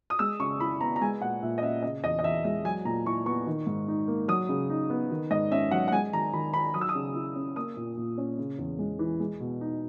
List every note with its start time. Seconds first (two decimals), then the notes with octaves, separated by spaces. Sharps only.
0.10 D#6
0.19 G#3 E6
0.40 C#3 C#6
0.60 E4 B5
0.81 B3 A#5
0.96 A#5
1.01 G#3 G#5
1.21 A#2 F#5
1.42 A#2 E5
1.58 D#5
1.62 C#4 E5
1.83 C#3 D#5
2.03 E2 D#5
2.19 D#5
2.23 E2 E5
2.44 G#3 E5
2.64 F#3 G#5
2.85 A#2 A#5
3.06 E4 C#6
3.26 B3 C#6
3.47 D#3
3.67 G#2
3.88 D#4
4.08 A#3
4.28 F#3 D#6
4.49 C#3
4.70 D#4
4.90 B3
5.11 D#3
5.31 G#2 D#5
5.51 C#4 E5
5.71 F#3 F#5
5.88 F#5
5.92 G#3 G#5
6.13 D#3 A#5
6.33 D#3 B5
6.54 D#4 B5
6.74 F#3 D#6
6.81 E6
6.89 D#6
6.95 C#3
7.15 E4
7.35 C#4
7.56 A#3 D#6
7.77 A#2
7.97 A#2
8.18 C#4
8.38 C#3
8.58 E2
8.79 G#3
8.99 E3
9.20 G#3
9.40 B2
9.61 D#4